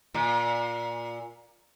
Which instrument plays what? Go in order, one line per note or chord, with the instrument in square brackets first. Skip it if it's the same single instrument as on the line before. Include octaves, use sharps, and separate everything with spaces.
[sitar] A#2